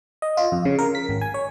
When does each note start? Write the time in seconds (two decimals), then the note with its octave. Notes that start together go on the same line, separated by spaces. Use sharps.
0.22 D#5
0.37 F4
0.52 F2
0.65 C#3
0.79 A#4
0.95 B6
1.09 G#1
1.21 G#5
1.34 C#5